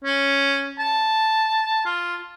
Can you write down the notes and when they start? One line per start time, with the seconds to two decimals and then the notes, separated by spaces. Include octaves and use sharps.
0.04 C#4
0.79 A5
1.85 F4